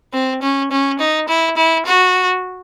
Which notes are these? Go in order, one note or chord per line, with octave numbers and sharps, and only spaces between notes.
C4
C#4
C#4
D#4
E4
E4
F#4